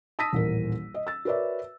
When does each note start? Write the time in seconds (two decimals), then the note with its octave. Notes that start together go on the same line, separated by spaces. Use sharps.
0.19 A5 D#6 E6 A#6 B6 D#7
0.32 D#1 A1 A#4
0.94 D#5
1.07 E6 A6
1.25 F#4 A#4 B4 C#5 D5 E5